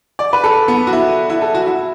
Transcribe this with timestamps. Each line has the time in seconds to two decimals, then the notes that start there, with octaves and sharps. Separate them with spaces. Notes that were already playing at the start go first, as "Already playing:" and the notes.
0.19 D5
0.33 B4
0.44 A4
0.68 B3
0.87 F#4
0.93 E4
1.30 E4
1.42 A4
1.55 F#4
1.67 E4